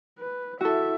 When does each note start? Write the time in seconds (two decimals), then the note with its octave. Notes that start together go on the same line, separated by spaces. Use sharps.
0.19 B4
0.61 E4 F#4 A4 E5